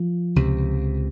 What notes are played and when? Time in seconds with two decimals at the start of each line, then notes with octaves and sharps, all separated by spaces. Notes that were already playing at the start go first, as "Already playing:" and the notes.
Already playing: F3
0.36 C#2 C3